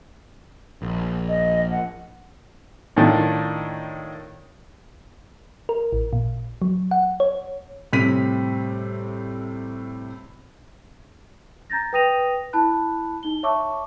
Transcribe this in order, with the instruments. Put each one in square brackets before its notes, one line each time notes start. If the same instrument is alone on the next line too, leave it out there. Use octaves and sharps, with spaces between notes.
[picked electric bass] A#1
[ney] D#5
F#5
[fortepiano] A2 D#3 D4 F4
[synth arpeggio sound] A#4
A1
A#2
F#3
F#5
C#5
[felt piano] A2 C3 G3 C4 B6 D#7
[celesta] A#5 G6 A6 A#6
B4 G5 D#6 A#6 D#7 F7
E4 A5 B5 F#6
D#4 G7
C#5 E5 A5 C#6 D6 E6